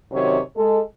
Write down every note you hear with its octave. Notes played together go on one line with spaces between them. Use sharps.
F#2 C3 D#3 C#5
G#3 A4